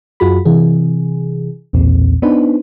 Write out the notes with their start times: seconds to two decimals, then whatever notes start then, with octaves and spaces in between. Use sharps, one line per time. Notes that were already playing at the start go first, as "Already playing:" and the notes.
0.20 F#2 F4 F#4 G#4 B5
0.45 C3 E3 G#4
1.73 B1 E2 A#2 C4
2.22 B3 D4 D#4 B4 C5